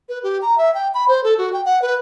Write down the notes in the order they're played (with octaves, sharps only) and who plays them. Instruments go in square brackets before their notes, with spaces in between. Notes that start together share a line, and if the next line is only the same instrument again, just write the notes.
[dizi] B4
G4
A#5
E5
G5
B5
C5
A4
F#4
G5
F#5
B4